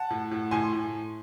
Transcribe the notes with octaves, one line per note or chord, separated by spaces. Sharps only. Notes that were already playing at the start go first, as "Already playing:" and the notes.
Already playing: F#5 A5
A2
A2
A2 G#5 C6
A2